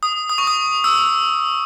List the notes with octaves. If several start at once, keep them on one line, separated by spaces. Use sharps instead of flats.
D#6
D#6
C#6
D#6
E6